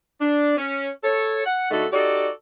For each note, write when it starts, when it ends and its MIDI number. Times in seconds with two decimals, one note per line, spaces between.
0.20 0.55 62
0.57 0.88 61
1.04 1.44 69
1.04 1.44 73
1.46 1.70 78
1.71 1.85 50
1.71 1.85 57
1.71 1.85 63
1.71 1.85 66
1.71 1.85 69
1.92 2.29 63
1.92 2.29 66
1.92 2.29 67
1.92 2.29 69
1.92 2.29 74